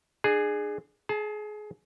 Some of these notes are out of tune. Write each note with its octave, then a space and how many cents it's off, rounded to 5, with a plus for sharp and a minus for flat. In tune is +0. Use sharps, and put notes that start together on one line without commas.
D4 +35 G#4 +0
G#4 +25 A5 -10